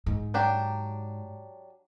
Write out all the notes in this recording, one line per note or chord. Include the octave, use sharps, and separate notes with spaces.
G#2
F#3 D4 G4